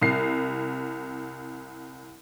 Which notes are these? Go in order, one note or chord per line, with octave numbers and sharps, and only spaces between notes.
C2 C7